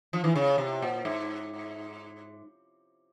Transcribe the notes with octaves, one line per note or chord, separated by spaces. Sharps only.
F3
E3
C#3
C3
A#2
G#2